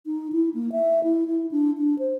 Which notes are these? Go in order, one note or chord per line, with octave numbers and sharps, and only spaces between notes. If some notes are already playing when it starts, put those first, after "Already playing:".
D#4
E4
A#3
E5
E4
E4
D4
D4
C5